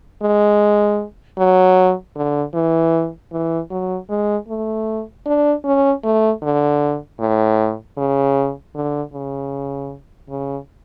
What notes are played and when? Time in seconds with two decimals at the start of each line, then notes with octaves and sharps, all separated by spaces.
0.23 G#3
1.38 F#3
2.16 D3
2.54 E3
3.33 E3
3.71 F#3
4.09 G#3
4.48 A3
5.26 D4
5.65 C#4
6.04 A3
6.43 D3
7.20 A2
7.97 C#3
8.75 D3
9.13 C#3
10.30 C#3